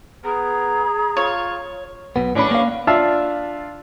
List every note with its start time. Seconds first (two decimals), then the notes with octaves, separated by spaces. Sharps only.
0.24 B3 G#4 A#5
1.17 F4 C#5
2.16 B1 B2 B3
2.35 E2 A2 C#4 D4 B5
2.51 A#3 F5
2.87 D4 F4 E5 F5 A5